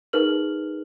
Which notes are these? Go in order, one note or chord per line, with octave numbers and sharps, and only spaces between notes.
D#4 G#4 A#4 B4 F6 F#7